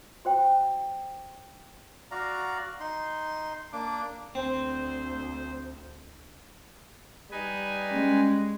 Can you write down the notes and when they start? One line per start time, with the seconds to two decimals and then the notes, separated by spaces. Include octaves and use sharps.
0.25 F#4 C5 G5
2.11 F#4 D5 F5 A#5
2.80 D#4 C6
3.73 A#3 D4 D6
4.35 D2 C4 C5
7.31 G3 D#4 B4 G#5
7.91 G#3 C#4